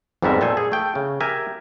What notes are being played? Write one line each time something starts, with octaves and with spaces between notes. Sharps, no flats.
F2 G#2 G3 B3 A#4 E5
A#2 A4 C5 G#5
G#4
A3 G5
C#3
G4 A#4 E5 G#5